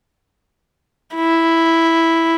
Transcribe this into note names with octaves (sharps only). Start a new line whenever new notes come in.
E4